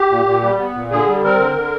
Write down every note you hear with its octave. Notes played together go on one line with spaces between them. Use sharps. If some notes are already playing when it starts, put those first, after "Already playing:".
Already playing: G4
A#2
A#2
G3
B3
A#2
D3 G#4
G3
C4 A#4
D3
D3